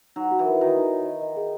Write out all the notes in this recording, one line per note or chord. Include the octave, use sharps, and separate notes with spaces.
F#3 D#4
F#4
E3
A#4
D#3 F#4
D#4
C#5
D#5
D#5
G#4